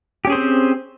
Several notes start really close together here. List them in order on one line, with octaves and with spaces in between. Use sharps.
G4 C#4 G#4 C5 C4